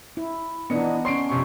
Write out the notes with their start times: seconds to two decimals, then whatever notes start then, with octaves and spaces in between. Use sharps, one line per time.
0.17 E4
0.70 E3 B3 D4 D#4 D#5 C#7
1.05 C#4 C#5 C6 C7 D7
1.29 F2 C3 C#6